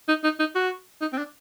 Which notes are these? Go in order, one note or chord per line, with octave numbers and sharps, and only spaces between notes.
D#4
D#4
D#4
F#4
D#4
C4
D4